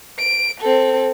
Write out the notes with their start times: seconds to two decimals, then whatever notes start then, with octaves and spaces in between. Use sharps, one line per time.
0.19 D7
0.61 C4 A4